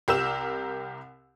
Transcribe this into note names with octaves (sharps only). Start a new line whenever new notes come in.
C2 G4 A#4 E6 E7